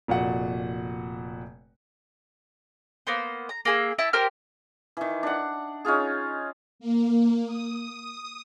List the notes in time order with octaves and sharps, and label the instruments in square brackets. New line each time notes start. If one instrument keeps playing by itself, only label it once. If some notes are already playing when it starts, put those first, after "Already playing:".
[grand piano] F1 A#2 F#4 F#5
[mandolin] A#3 B3 C5
A#5
A#3 G#4 E6
E4 E5 A5
G4 A#4 C5 F6
[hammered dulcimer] D#3 E3
D4 F#5
C#4 D#4 F4 G#4
[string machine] A#3
D#6